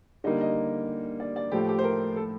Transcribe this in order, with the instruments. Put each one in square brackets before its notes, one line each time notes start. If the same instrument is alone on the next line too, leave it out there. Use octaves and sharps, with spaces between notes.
[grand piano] D3 G3 A#3 D#4 [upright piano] D#5
[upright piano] D#5
D5
D5
[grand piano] A2 F3 A3 [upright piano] G4
[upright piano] G4
C5
A#4
A4